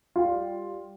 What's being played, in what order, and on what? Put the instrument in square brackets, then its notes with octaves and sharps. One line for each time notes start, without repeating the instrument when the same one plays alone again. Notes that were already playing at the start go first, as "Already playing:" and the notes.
[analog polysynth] G3 [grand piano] F4